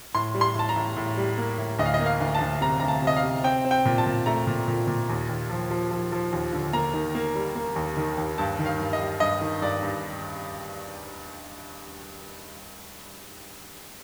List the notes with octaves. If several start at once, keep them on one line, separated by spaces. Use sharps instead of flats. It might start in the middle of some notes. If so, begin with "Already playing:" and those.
A2 C6
G3
C6
A2 A5
A#5
A2
A2
G3
A#3
A2
D2 D#5
F5
D#5
A#3
F5
D2
A5
D2
C3 A#5
D2 A#5
A5
C3
D#5
F5
C3
C4 G5
C4
G5
A#2
A5
A#2
A3 A#5
A#2
A#2
A#2
D#2
D#2
F3
F3
F3
F3
D#2
D3
A#3 A#5
D#3
A#3
G3
A#3
D#2
D#3
D#2
G2 A5
D#3
F5
G2
D#5
G3
G2 D#5
D#3
G2 D5
G2